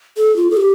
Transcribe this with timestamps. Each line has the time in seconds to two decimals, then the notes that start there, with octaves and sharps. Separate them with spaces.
0.17 A4
0.36 F4
0.51 A4
0.57 G4